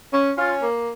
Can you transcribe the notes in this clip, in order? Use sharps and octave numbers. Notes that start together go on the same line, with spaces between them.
C#4
C#4 F4
A#3